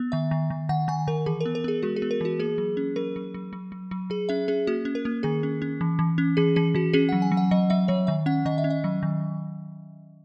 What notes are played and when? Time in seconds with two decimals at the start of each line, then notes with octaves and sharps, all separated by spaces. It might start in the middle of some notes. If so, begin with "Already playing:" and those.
Already playing: B3
0.12 D#3 E5
0.31 D#3
0.50 D#3
0.69 D#3 F#5
0.88 D#3 G#5
1.07 D#3 A#4
1.26 E3 G#4
1.41 A#4
1.46 B3
1.55 A#4
1.64 B3 G#4
1.83 G#3 F#4
1.96 G#4
2.02 B3
2.11 A#4
2.21 E3 F#4
2.39 A#3 G#4
2.58 F#3
2.77 C#4
2.96 F#3 A#4
3.16 F#3
3.34 F#3
3.53 F#3
3.72 F#3
3.91 F#3
4.10 F#3 G#4
4.29 C#4 E5
4.48 C#4 G#4
4.67 A#3 F#4
4.85 C#4
4.95 A#4
5.05 A#3
5.23 D#3 G#4
5.43 C#4
5.62 C#4
5.81 E3
5.99 E3
6.18 C#4
6.37 E3 G#4
6.56 E3 G#4
6.75 E3 F#4
6.93 C#4 G#4
7.09 F#5
7.12 F#3
7.22 G#5
7.32 F#3
7.37 F#5
7.51 F#3 D#5
7.70 F#3 E5
7.88 F#3 C#5
8.07 D#3 E5
8.26 C#4 F#5
8.46 D#3 D#5
8.58 E5
8.64 C#4
8.70 D#5
8.84 F#3
9.03 D#3